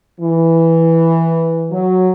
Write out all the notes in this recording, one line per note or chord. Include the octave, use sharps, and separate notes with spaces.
E3
F#3